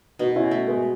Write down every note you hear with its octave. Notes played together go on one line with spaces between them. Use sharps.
B2 B3 D#4
C#4 E4
A3
G#3 B3